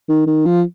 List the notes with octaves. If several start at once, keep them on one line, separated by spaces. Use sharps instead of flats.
D#3
D#3
F3